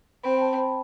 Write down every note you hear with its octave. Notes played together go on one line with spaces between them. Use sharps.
C4 B5
G5
A5
B5